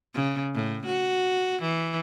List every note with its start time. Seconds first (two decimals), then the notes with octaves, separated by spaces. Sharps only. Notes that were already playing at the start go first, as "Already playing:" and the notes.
0.14 C#3
0.55 A2
0.86 F#4
1.62 E3